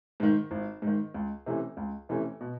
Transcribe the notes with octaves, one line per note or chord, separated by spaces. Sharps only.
G#2 D#3
G#1
G#2
D#3
C#2
C3 E3 A3 C#4
C#2
C3 E3 A3 C#4
B2